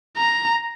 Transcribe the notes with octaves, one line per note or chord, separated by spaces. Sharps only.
A#5